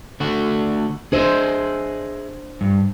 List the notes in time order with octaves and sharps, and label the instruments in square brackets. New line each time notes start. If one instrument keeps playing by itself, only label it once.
[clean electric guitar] D3 A3 F#4
[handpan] D4 C5 [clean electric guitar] G#4 D#5 E5
[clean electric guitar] G2